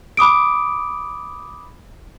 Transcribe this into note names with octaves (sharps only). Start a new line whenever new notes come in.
B5 D6 D#6 D7